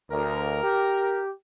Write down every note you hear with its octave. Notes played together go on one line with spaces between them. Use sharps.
D2 A#4
G4